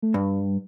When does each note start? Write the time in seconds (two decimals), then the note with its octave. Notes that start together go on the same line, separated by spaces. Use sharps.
0.02 A3
0.14 G2 G3